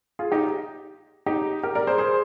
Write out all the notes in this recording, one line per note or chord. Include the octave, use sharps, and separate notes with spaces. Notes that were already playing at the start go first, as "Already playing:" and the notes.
F4 G#4
D#4 G4
D#4 G4
G4 A#4
A#4 D5
G#4 C5
G#4 C5